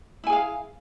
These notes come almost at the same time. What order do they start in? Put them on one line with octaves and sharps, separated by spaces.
E4 G#5 G#4 F5